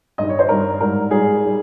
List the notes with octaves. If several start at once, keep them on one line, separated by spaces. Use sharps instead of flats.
G2 D#3 G3 D#5
C#5
C5
G2 D#3 G3 A#4
G#2 G3 A#4
G#2 G3 G#4
G3